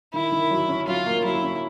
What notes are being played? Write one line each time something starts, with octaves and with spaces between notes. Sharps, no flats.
D#3 E4
D#3
F#3
C#4
F#3 F4
A#3
F#3 E4
C#4